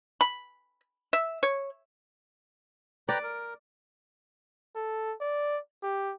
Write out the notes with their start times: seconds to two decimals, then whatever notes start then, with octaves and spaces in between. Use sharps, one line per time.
0.21 B5
1.13 E5
1.43 C#5
3.09 B4 D5 G5 A#5
3.23 A#4
4.76 A4
5.20 D5
5.83 G4